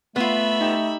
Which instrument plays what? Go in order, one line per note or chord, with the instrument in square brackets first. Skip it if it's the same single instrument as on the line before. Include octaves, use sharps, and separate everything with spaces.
[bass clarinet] A3 [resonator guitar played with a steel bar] B3 F4 [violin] E5 B5
[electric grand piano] D#4 G4 E7